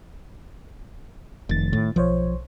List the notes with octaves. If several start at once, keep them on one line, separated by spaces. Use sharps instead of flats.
F1 D#3 A6
A2
B1 F3 C5 C#5